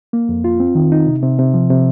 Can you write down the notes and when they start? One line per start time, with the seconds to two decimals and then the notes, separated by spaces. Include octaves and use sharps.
0.13 A#3
0.29 F2
0.44 F4
0.60 C4
0.75 D#3
0.92 D#4
1.07 C3
1.23 C3
1.39 C3
1.54 F3
1.70 C3